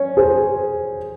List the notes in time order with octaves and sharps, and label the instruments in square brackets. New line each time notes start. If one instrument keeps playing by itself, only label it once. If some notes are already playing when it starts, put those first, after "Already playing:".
Already playing: [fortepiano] C#4
[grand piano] G#4 C5